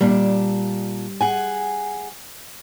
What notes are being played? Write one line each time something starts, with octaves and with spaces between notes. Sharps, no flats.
A#2 G3 D4
G#4 F#5 G#5